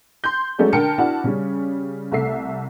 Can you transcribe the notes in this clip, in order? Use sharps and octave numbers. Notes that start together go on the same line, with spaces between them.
C6 G6
F#3 G#3 A3 C#4 G#4 D5
D3 A#4 G5 A5 F6 C#7
D4 E4 F#4 F#5 A5
C#3 G3 C#4
C2 A3 E5 C7